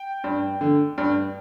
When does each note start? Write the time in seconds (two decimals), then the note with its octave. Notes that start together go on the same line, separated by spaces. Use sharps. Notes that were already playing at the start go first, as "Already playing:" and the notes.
Already playing: G5
0.24 G2
0.61 D3
0.98 G2